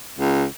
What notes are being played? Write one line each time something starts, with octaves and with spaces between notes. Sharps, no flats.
C#2